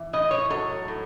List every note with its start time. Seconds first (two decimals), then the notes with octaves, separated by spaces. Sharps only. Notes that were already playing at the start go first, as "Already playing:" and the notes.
Already playing: E3
0.13 A2 D#5
0.31 C#5
0.50 F#3 A4
0.88 A2